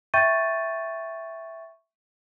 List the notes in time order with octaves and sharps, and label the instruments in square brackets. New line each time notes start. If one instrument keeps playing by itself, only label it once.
[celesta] E5 G5 C#6 G6 A6 D#7